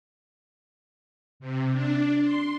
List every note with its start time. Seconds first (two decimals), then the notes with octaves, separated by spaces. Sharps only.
1.40 C3
1.72 D4
2.22 C6